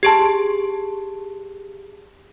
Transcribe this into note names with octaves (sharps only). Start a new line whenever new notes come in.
G4 G#4 A5